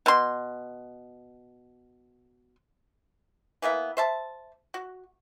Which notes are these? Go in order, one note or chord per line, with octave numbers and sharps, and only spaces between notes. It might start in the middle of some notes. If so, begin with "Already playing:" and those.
B2 C6
E3 A#3 B3 E5
C5 E5 A5
F#4